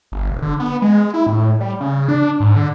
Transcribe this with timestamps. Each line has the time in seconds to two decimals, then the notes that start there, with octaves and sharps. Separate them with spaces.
0.12 G1
0.30 E1
0.42 D3
0.60 B3
0.82 G#3
1.14 E4
1.27 A2
1.60 G3
1.80 C#3
2.08 D4
2.40 G#2
2.56 D3